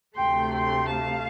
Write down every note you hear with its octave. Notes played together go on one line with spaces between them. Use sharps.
D2 C3 A3 G5 C6
G5 C6
F5 A5